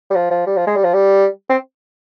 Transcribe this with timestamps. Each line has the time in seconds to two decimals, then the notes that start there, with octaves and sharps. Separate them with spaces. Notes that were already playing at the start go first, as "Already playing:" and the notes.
0.10 G3
0.15 F3
0.31 F3
0.46 G3
0.57 F3
0.67 G#3
0.76 G3
0.84 F3
0.94 G3
1.49 C4